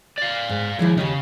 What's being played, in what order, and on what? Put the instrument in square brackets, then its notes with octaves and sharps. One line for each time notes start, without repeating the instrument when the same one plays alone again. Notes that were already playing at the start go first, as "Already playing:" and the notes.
[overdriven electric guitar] D5 F5
[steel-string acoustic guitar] G#2
[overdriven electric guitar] D#2 [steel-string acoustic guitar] F3 G#3 E4
[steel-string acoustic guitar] D#2 G4 D#5 [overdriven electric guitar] C#3